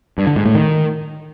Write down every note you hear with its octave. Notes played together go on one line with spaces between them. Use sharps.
G2
D3
G#2
A2
D#3